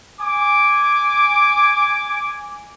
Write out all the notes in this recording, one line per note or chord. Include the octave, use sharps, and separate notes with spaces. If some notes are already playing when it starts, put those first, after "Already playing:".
G#5 D6